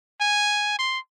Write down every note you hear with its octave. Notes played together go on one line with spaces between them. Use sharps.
G#5
C6